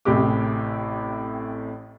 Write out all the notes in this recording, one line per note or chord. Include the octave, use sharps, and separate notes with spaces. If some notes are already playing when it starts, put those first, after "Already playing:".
A1 A2 C3 G4 G#4 D6